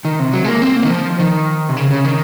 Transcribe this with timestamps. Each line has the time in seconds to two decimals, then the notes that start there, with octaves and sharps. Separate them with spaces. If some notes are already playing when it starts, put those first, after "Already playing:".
0.05 D#3
0.20 C3
0.33 F#3
0.44 G#3
0.47 A#3
0.62 C4
0.76 A#3
0.84 D#3
0.90 F3
1.20 D#3
1.69 C3
1.77 C#3
1.90 C#3
2.05 D#3